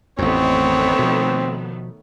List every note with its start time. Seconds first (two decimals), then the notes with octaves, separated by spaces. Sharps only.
0.19 A1 F2 D#3 A3 B3 C4 C#5
0.99 B2 F3